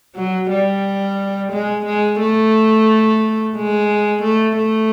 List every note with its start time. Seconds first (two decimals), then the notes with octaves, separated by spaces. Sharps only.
0.16 F#3
0.51 G3
1.52 G#3
1.85 G#3
2.20 A3
3.56 G#3
4.23 A3
4.57 A3